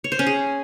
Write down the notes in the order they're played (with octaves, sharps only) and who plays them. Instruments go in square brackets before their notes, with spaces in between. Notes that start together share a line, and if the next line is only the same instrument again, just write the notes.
[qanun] C#5
C5
C#4
G#4